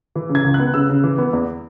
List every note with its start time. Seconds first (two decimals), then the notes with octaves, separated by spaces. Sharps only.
0.15 E3
0.29 C#3
0.35 G#6
0.44 C#2
0.54 F#6
0.60 B3
0.74 C#3 E6
0.89 C#3
1.04 E3
1.18 B3
1.33 E2